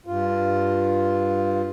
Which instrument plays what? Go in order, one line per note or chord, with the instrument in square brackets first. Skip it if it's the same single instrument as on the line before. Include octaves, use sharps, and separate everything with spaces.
[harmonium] G2 F4